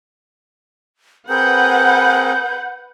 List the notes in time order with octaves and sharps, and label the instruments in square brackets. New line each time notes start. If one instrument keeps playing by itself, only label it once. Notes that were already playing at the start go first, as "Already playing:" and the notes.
[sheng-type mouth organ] C4 G#4 A#4 [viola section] B4 F#5 [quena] G6